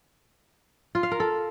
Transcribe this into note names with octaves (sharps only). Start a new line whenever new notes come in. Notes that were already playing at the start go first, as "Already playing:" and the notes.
F4
F5
A#4
A4